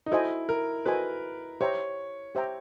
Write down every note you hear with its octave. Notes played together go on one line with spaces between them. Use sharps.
D#4
E4 F#4 A4 C5 D#5 G#5
A#4
F#4 A4 B4 C5 D#5 G#5
G4 C5 C#5 E5 G5 A#5
G4 C5 E5 G5 A#5